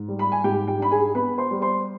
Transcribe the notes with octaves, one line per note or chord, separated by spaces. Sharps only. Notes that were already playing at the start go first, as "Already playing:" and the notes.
Already playing: G#2
G3
B5
G#5
G#2 G4 G5
G4 G5
D4 B5
G#4 G#5
B3 B4 B5
C5 C6
G3
C5 C6